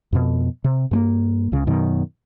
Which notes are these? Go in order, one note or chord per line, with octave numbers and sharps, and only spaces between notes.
F2 B2
C3
G2 G#3 A#3
C#2 C#3
F#2 B2 D#3